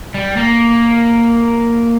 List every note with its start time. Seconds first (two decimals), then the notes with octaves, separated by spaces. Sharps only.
0.14 G3
0.37 A#3